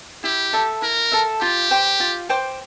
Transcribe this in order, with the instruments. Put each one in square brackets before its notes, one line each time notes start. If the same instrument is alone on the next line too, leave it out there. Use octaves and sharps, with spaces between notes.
[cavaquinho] E4 [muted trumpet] G4
[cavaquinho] A4 E5
[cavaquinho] E4 [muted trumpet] A#4
[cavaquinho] A4 E5
[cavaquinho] F4 [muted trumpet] G4
[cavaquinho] C5 G5 D6
F4
C5 G5 D6